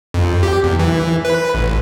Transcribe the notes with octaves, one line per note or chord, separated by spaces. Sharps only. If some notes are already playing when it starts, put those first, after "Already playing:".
F2
G4
E2
E3
B4
A1